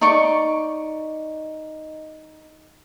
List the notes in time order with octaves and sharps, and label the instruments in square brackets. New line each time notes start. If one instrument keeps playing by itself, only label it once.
[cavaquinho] D#4 D5 C#6 D6